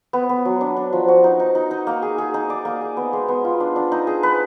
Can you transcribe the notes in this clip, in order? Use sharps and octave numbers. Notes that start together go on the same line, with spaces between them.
B3
B3
F#3
D4
D4
F3
F#4
D#4
D#4
D#4
D#4
A#3
G#4
G#4
D#4
D5
A#3
G#4
B3
G#3
B3
F4
D4
D4
D#4
G#4
B4